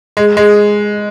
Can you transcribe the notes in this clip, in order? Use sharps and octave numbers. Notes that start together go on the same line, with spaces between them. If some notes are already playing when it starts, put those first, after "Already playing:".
G#3
G#3